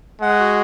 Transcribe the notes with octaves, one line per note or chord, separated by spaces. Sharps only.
G#3 F#5
F#4